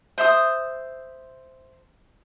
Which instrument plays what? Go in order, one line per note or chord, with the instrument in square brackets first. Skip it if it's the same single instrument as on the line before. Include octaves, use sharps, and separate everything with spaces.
[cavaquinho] C5 E5 D#6